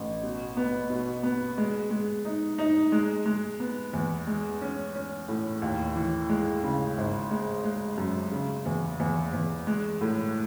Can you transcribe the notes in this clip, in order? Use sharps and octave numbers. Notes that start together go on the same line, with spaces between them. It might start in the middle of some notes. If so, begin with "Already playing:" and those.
Already playing: A1
B2
B3
B2
B3
G#3
G#3
D#4
D#4
G#3
G#3
B3
E2
G#3
C#4
C#4
A2
D#2
E3
G#3
C#3
G#1
G#3
G#3
F#2
C#3
E2
E2
E2
G#3
A2